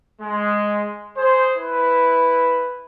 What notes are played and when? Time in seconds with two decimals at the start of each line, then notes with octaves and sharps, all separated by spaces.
0.21 G#3
1.17 G#4 C5
1.57 E4 B4